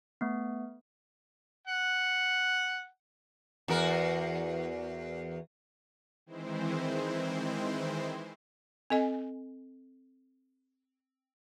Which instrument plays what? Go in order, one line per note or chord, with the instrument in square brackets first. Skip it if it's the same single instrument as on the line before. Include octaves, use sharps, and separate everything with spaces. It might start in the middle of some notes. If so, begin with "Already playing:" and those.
[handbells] A3 B3
[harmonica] F#5
[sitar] E2 F#4 A#4
[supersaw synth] D#3 E3 G#3 C4 E4 C5
[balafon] C4 A4 D#5 G#5